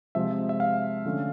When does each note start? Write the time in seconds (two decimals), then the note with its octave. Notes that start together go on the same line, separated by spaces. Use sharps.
0.15 C3 F3 G#3 E5
0.49 E5
0.60 F5
1.05 D3 F3 A3 C#4